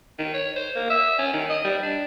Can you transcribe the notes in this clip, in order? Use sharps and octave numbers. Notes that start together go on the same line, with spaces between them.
D#3
C#5
C5
A#3
E5
C#4
D#3
D#5
G3
D4